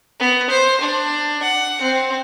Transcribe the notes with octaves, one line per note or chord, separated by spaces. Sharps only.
B3
C5
D4
F#5
C4